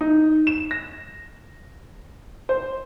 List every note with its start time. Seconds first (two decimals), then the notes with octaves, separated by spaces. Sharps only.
0.01 D#4
0.47 E7
0.71 A#6
2.49 C5